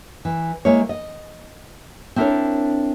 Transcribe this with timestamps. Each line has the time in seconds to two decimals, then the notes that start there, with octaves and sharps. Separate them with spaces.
0.25 E3
0.65 G#3 A#3 E4 C#5
0.89 D#5
2.16 C4 D4 E4 A4 A#4 C#5